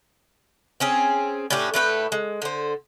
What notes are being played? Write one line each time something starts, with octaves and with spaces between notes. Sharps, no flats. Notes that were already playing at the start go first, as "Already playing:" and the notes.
C4 C#4 G#4
A2 C#4 D4 G4
A2 A3 B4 G5
G#3
D3 C5